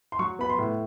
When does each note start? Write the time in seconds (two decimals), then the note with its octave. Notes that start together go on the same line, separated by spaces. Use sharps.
0.12 C6
0.19 F#3 C#6
0.39 B3 B5
0.49 C6
0.59 A2